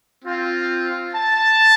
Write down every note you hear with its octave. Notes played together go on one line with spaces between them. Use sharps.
C4 F4
A5